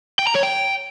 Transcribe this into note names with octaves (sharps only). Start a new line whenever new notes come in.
G5
A#5
C#5
G5